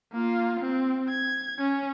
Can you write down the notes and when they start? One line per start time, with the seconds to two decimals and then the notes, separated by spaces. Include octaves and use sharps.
0.12 A#3 F4
0.60 C4
1.09 G#6
1.58 C#4